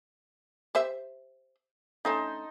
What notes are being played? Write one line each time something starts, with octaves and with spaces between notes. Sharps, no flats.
G4 C5 E5
D3 A3 C#4 D#4 A5 C6